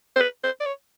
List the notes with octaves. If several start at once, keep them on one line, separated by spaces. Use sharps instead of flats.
C5
B4
C5
D5
C#5